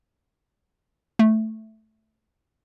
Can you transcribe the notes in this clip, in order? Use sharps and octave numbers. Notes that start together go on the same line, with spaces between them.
A3